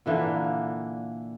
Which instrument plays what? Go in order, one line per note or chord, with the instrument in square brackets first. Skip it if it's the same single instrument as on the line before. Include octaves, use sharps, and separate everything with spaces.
[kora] A#2 D3 E3 A#3